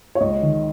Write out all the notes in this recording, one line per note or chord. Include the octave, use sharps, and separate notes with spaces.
C#5
C#2 D#5
D#3